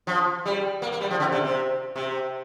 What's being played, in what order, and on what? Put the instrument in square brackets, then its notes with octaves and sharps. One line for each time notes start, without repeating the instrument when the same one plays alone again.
[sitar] F3
G3
A#3
A#3
G3
F3
D3
C3
C3
C3